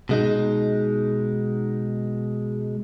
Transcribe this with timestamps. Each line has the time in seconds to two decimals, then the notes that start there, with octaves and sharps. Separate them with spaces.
0.09 B2 G#3 D#4